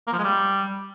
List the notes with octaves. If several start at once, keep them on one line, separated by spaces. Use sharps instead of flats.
A#3
F3
G#3
G3